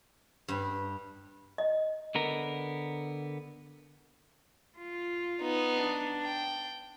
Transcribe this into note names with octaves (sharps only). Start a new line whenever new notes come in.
G2
D#5
D3 B3 A#4
F4
B3 D#4
D4
G5